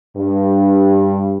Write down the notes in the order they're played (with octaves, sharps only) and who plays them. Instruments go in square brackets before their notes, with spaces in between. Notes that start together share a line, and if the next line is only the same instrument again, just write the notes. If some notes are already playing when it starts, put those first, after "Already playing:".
[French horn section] G2